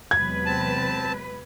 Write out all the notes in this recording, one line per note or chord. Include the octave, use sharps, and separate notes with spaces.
E2 C3 F#3 G#3 B4 G#6
C4 A5